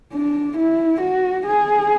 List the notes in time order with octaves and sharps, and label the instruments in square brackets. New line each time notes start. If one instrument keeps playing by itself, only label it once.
[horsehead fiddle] D4
E4
F#4
G#4